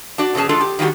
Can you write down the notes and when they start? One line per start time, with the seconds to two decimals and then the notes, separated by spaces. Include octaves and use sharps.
0.18 D4 F#4 D5
0.35 B2 E3 C#4 G#4 A5
0.49 G#3 D4 F4 A4
0.61 G4
0.79 D#3 G3 A3 F#4 G4